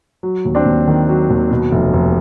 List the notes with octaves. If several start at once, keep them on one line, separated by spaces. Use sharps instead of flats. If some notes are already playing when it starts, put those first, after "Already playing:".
F#3
D#2
C4 D4
D#2
D#3
F#3
D#2
B2
F1
F1